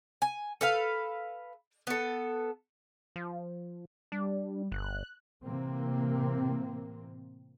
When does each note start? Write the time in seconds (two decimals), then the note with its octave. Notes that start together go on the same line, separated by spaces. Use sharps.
0.22 G#5
0.61 A4 B4 F5
1.87 B3 A4
3.16 F3
4.12 G3 D4
4.72 G1 F#6
5.43 A2 C3 E3 A#3 C4